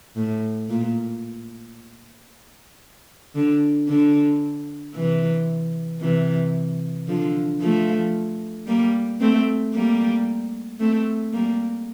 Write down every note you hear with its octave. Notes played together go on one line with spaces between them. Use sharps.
A2
A#2
D3
D3
C3 E3
C3 E3
D3 F3
F3 A3
G3 A#3
A3 C4
G3 A#3
A3 C4
G3 A#3